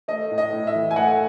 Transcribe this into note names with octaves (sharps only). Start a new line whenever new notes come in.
A3 D#5
A2
D#5
A2
E5
E3
G#5
A3 F#5